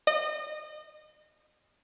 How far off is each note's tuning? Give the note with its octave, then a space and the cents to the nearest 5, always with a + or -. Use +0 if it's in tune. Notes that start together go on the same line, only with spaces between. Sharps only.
D#5 -30